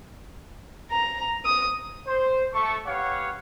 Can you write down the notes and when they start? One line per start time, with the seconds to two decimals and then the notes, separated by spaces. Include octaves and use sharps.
0.91 A#5
1.45 D#6
2.06 C5
2.54 A3 A4 C#6
2.87 B3 G4 C#5 F5 F#5